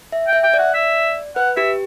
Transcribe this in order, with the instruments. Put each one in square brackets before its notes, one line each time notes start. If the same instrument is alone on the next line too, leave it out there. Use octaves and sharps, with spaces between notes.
[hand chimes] E5
[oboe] G5
[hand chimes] E5
[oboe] G5
[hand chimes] D5
[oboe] F#5
E5
[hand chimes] B4 [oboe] F#5
[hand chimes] G4 [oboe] E5